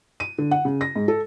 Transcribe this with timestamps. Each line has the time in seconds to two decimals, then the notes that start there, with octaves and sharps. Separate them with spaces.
0.20 D#7
0.38 D3
0.51 F#5
0.65 C#3
0.81 A#6
0.96 G#2
1.08 A4